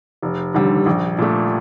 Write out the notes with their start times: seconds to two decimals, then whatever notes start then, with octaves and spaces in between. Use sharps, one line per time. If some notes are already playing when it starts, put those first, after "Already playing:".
0.23 F1
0.54 D#2 D3 G3
0.86 A#1
1.18 A#2 A3